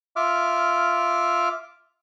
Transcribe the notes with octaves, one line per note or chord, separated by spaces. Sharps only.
F4 E5 D6 F6